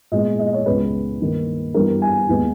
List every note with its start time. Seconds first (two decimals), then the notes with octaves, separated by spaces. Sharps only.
0.12 A#2 G#3 B3 D#5
0.39 D#5
0.53 C#5
0.66 C#2 C#3 G#3 B3 B4
1.20 G2 D#3 A#3
1.74 G2 E3 G3 B3 A#4
2.02 G#5
2.29 D#2 D#3 G#3 B3